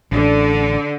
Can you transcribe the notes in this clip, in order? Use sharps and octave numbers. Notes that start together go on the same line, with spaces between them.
A1 D3